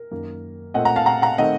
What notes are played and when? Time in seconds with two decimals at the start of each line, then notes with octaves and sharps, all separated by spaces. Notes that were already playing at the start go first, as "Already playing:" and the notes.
Already playing: A#4
0.11 F#2 D#3 A#3
0.74 A#2 A3 C4 D#5 F#5
0.85 F#5 A#5
0.96 F5 A5
1.06 F#5 A#5
1.22 F#5 A#5
1.38 D#3 A3 C4 D#5 F#5